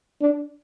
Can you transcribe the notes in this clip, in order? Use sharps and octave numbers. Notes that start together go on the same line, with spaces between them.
D4